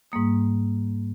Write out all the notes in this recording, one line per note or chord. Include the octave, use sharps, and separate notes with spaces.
G#2 G3 A#3 D#6